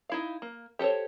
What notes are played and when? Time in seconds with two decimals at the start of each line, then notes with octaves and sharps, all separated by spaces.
0.10 D#4 E4 F5
0.42 A#3
0.79 G4 A4 A#4 C5 C#5